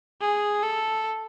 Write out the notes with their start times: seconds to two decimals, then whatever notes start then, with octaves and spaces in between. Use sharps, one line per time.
0.21 G#4
0.63 A4